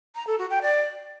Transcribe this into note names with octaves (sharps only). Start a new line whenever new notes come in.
A#5
A4
F#4
G5
D5